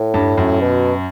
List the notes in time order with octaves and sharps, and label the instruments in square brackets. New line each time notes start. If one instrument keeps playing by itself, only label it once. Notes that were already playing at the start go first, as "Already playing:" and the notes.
Already playing: [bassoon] A2
[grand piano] G2
F#2
[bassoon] B2